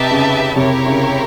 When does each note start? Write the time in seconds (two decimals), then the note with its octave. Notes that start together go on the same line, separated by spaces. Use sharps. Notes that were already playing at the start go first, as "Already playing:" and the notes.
Already playing: C3 D#4 G4 B4 E5 A5
0.11 C#3
0.56 C3 E4 G4 A#4 C#5
0.87 C#3